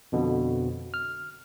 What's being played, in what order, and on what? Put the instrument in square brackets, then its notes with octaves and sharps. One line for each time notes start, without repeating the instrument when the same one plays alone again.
[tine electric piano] F2 B2 D3
F6